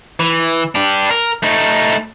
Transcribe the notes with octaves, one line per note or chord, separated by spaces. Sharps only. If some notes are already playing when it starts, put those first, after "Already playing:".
E3
D4 G4
A#4
A3 D#4